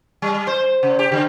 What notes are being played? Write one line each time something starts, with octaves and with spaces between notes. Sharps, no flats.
G3
C5
C#3
G4
D3